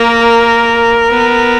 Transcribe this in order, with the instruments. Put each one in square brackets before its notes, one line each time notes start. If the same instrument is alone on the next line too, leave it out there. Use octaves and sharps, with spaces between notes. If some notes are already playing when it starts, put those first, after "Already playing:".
Already playing: [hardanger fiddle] A#3 [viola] A#4
[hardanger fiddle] B3